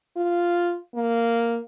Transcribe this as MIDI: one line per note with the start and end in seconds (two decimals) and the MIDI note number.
0.17 0.78 65
0.95 1.60 58